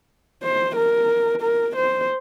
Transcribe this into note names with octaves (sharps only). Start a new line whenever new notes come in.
C5
A#4
A#4
C5